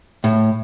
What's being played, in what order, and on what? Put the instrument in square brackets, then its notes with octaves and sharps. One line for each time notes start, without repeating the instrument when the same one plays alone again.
[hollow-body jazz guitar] A2